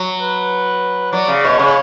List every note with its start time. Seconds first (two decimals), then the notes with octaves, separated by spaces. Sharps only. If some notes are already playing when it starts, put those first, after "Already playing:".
Already playing: F#3
0.20 B4
1.13 F#3 D5
1.28 C#3
1.44 B2 C#5
1.59 C#3